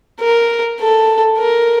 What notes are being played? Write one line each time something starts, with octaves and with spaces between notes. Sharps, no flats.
A#4
A4
A#4